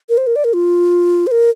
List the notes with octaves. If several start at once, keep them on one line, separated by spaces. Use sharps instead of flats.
A#4
C5
A#4
D5
A#4
F4
C5
A#4